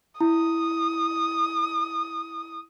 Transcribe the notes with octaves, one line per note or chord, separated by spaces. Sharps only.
E4 D#6